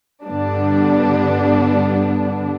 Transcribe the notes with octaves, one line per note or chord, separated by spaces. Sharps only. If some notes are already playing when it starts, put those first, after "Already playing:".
G2 D3 G3 B3 D4